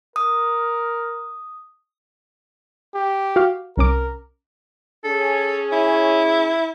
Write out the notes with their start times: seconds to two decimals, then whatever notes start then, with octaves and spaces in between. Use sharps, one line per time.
0.16 A#4 D#6
2.94 G4
3.36 F#4 F5
3.77 C2 C#4 A#4 D6
5.05 C#4 G#4 A4
5.73 E4